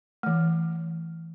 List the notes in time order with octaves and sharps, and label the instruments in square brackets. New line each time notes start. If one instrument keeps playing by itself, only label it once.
[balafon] E3 A3